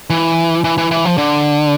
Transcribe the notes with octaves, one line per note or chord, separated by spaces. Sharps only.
E3
E3
E3
E3
F3
D3